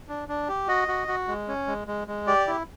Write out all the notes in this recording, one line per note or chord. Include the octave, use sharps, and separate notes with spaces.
D4
D4
G4
F#4 D#5
F#4
F#4
G#3
C#4
G#3
G#3
G#3
G4 D5
E4